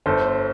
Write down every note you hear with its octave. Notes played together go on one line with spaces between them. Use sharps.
G1 A4 C5